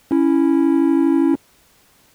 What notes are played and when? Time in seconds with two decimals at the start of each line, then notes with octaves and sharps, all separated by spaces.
0.11 C#4 E4